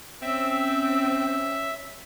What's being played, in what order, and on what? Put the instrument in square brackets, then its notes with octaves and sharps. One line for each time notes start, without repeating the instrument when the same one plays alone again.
[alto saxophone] C4 [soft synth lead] C#4 [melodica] E5